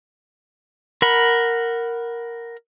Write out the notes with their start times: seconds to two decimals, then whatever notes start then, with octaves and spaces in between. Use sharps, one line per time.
1.02 A#4 F#5 B5